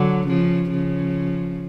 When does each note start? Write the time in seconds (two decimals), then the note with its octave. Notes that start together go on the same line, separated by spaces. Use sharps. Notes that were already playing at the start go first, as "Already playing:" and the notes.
Already playing: D3 F#3
0.27 C#3 F3
0.71 C#3 F3